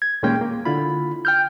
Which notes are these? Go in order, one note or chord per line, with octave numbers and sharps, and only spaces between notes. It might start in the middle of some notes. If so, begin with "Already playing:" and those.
G#6
D#2 A#2 G#3 A#3 C#4 G5
A#3
D3 E4 F4 B5
G5 F6 G6